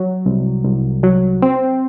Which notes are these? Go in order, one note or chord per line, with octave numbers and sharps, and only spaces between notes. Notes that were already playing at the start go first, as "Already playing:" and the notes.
Already playing: F#3
C2
C2
F#3
C4